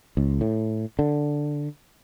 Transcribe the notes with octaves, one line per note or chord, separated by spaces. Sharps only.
C#2
A2
D3